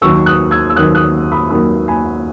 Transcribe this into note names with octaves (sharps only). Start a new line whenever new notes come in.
D#2 D#3 F#3 A#3 C#6 E6
D#6 F#6
E6 G#6
E6
D#2 D#3 F#3 A#3 D#6 F#6
D#6 F#6
B5 D#6
D#2 D#3 F#3 A#3 B5 D#6
G#5 B5